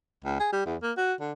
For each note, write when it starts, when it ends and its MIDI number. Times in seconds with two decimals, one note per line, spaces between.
0.24 0.39 37
0.40 0.50 68
0.53 0.64 55
0.66 0.76 40
0.83 0.92 58
0.98 1.14 66
1.21 1.32 50